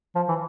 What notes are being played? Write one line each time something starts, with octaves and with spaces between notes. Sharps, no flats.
F3
E3